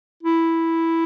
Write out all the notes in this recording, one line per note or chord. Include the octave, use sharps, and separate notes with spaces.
E4